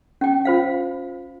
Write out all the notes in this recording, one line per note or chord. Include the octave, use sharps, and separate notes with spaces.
C#4 G5
F4 C5 F5